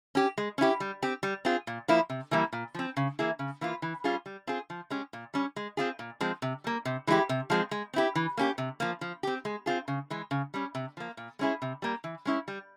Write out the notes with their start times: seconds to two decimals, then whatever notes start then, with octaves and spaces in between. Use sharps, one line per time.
0.15 C#4 G4
0.38 G#3
0.58 C#4 E4 G4
0.80 G3
1.02 C4 G4
1.23 G3
1.45 C4 F4 G#4
1.67 A#2
1.88 F3 A#3 E4
2.10 C3
2.31 E3 G3 A#3 E4
2.53 A#2
2.75 F3 C4
2.97 C#3
3.19 E3 A#3 E4 G#4
3.39 C#3
3.61 E3 A#3 F4
3.82 E3
4.04 G3 C#4 F4 G#4
4.26 G3
4.47 C4 F4 G#4
4.70 F3
4.90 G#3 C#4 G4
5.13 A#2
5.34 G3 C#4
5.56 G#3
5.77 C4 F4 G#4
5.99 A#2
6.21 F3 G#3 C4
6.42 C3
6.64 G3 A#3
6.85 C3
7.07 E3 G#3 E4 G4
7.29 C3
7.50 F3 G#3 C4
7.71 G#3
7.94 C4 E4 G4
8.15 E3
8.37 A#3 C#4 G4
8.58 C3
8.80 F3 A#3
9.01 F3
9.23 C4 G4
9.45 G#3
9.66 C4 F4 G#4
9.88 C#3
10.10 E3 G#3
10.31 C#3
10.54 G3 C#4
10.75 C3
10.97 F3 A#3
11.17 A#2
11.39 G#3 C#4 E4 G#4
11.62 C3
11.82 G3 A#3
12.04 E3
12.25 G#3 C#4 E4
12.48 G3